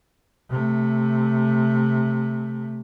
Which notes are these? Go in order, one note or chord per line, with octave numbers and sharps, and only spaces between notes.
C3 A3